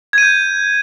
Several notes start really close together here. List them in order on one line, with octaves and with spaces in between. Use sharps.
G#6 D#7 G6